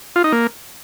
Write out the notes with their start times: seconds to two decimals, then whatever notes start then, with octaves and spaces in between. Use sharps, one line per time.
0.16 F4
0.24 D#4
0.32 A#3